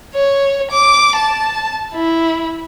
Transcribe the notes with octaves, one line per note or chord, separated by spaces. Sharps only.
C#5
D6
A5
E4